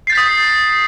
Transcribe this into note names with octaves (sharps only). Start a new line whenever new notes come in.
D#6 G6 A6 B6 C7